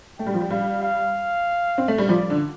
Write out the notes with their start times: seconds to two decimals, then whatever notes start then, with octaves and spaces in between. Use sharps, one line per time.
0.19 A3 G5
0.26 G3
0.34 F3
0.40 G3
0.50 G3 F5
0.83 F5
1.78 C4
1.88 A3
1.98 G3
2.09 F3 D5
2.30 D3